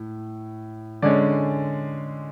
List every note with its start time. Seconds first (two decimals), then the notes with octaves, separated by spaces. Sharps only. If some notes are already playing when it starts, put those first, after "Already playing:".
Already playing: A2
1.02 D3 G#3 C#4 D5